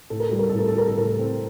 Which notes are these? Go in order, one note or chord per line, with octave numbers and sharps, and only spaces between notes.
A2 A4
A#4
G3 A4
A#4
A2 A4
A#4
A4
G3 A#4
A4
A2 A#4
A4
C4